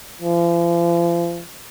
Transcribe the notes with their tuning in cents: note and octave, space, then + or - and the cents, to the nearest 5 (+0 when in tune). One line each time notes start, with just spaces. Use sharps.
F3 -40